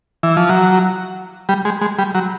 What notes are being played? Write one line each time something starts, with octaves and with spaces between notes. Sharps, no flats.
E3
F3
F#3
G3
G#3
G#3
G3
F#3